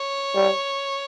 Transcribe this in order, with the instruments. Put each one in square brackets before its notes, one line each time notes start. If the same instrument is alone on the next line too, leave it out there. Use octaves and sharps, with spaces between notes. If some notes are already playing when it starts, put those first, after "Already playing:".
Already playing: [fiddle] C#5
[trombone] G3